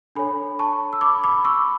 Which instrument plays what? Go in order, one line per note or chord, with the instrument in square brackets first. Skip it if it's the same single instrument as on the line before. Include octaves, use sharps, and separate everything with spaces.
[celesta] D4 A4 C#5 G#5 B5
A5 C#6
E6
B5 D6
B5 D6
C#6 E6